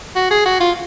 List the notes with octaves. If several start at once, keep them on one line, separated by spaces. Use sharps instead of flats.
F#4
G#4
F#4
F4